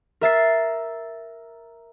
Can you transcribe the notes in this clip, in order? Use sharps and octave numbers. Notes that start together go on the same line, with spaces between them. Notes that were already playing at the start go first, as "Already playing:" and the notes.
A#4 E5 A6 C7